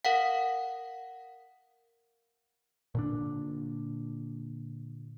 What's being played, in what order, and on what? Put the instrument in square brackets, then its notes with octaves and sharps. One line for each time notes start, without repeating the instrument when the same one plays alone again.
[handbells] A#4 F5 F#5
[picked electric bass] A#2 D3 D4